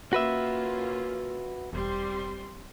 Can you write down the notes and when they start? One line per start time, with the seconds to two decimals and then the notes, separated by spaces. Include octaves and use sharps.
0.13 A#3 C#4 F4 F#4 B4 E5
1.73 E1 G3 C4 C6